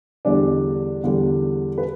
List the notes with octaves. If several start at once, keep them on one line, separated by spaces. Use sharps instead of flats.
E2 D3 G3 D4 D5
E2 D3 G3
B4